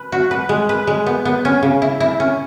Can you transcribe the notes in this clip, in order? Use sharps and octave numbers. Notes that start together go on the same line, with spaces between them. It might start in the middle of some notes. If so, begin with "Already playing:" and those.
Already playing: B4
F#4
B4
G#3
B4
G#3
B3
B3
C#4
C#3
E4
E4
C#4